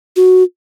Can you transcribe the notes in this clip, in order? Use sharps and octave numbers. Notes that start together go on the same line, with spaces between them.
F#4